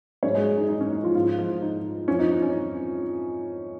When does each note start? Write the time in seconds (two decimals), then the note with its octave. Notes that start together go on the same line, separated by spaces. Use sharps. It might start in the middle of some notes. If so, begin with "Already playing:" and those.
0.23 G#2 F#3 C#4 C#5
0.35 G#3 G#4
0.58 D#4
0.68 D#4
0.81 C#4
0.92 D#4
1.04 F3 F4
1.15 G#2 F3 F4
1.38 F3 F4
1.62 D#4
2.08 F2 F3 C#4
2.19 D#4
2.31 D#4
2.42 C#4